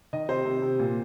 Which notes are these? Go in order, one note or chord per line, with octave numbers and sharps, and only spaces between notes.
D#3 D#5
C3 C5
C3
C3
A#2